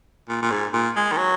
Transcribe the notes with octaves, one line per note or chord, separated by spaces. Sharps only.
A#2
A#2
G#2
A#2
G#3
D#3
F#3